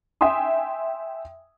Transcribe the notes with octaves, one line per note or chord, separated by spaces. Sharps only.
E5 G5 G#5 C6 D#6